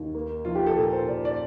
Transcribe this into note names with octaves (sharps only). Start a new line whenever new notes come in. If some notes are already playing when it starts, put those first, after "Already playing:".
Already playing: D#2
A#3
F3 F4
G4
A4
A#2 A#4
C5
A#2 D5
D5